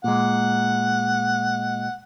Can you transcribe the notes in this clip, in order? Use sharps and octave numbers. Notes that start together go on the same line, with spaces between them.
A#2 G#3 F#5